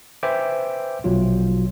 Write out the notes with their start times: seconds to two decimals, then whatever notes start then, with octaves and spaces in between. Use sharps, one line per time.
0.23 B4 C5 E5 G5 G#5 D6
1.04 A#1 B2 F#3 F4